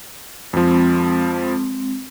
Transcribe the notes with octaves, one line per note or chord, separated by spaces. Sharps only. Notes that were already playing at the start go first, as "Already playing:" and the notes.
F2 F3 G#3 C4